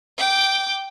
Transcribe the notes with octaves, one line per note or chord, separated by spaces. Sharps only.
G5 D6